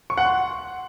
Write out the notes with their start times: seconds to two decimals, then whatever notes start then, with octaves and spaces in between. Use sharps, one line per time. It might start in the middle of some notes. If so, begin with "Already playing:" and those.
0.10 C#6
0.18 F#5
0.25 C6